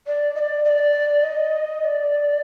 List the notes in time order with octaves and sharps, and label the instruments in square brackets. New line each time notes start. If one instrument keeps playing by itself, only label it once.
[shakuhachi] D5
D#5
D5
D#5
D5
D#5
D#5
D5